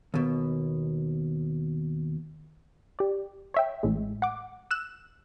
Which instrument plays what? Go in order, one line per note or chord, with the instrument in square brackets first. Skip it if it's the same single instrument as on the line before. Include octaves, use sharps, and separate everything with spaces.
[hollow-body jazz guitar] D#2 B2
[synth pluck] G4 D5
C#5 E5 G5
A1 A2 G#3
F#5 D6
E6 F#6 E7